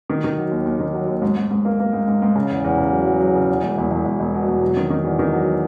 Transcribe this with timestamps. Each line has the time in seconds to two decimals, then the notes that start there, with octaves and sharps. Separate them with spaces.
0.09 D#3
0.24 D#3
0.38 F#3
0.51 D#2
0.65 D#2
0.80 D#3
0.94 F#3
1.08 D#2
1.22 G#2
1.37 G#2
1.51 G#2
1.65 A#3
1.79 A#3
1.93 G#2
2.07 G#2
2.22 G#2
2.36 C#3
2.49 E2
2.64 E2
2.78 C#3
2.92 F#3
3.06 F#3
3.20 F#3
3.35 C#3
3.48 E2
3.63 E1
3.78 E1
3.91 E1
4.05 E1
4.20 E1
4.34 B2
4.48 E1
4.62 F#3
4.77 D#3
4.90 D#3
5.04 E2
5.19 D#3
5.33 F#3